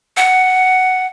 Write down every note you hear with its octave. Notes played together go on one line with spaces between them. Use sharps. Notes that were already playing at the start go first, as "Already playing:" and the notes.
F#5